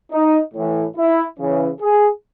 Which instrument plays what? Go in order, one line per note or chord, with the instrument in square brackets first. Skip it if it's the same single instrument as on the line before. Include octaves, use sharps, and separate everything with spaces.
[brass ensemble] D#4
A2 E3
E4
C#3 E3
G#4